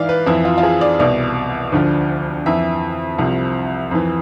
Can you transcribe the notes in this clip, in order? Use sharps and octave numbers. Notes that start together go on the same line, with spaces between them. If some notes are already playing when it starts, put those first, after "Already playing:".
Already playing: G#2 E3 D5 E5 F5
B4
F2 E3 E4
F4
F4
G#4
D5
C2 B2 D5
D2 D3 F3
F2 E3 E5
C2 C3 F3
F2 E3